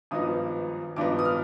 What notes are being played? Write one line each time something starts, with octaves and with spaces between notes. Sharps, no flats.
G#1 G2 F3 B3 D#4 D#6
G#1 G2 F3 B3 D#4 D6
D#6
F6